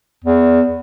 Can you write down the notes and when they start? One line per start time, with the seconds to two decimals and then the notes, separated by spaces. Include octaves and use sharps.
0.24 E2